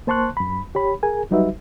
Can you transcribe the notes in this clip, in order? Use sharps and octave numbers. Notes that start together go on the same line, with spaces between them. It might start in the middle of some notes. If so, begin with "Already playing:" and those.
A#3 C5 A5 C6 C#6 F#6
F#2 B5
G4 C#5 B5
G#4 A#4 G#5
F#3 G3 D#4 F#4 B4 E5